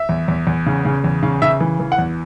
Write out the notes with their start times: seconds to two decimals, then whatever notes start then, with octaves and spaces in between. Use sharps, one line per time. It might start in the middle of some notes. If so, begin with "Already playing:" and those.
Already playing: E5
0.09 E2
0.28 E2
0.47 E2
0.66 C#3
0.85 C#3
1.04 E2
1.23 C#3
1.42 C#3 E5
1.60 E3
1.80 E3
1.92 F#5
1.98 E2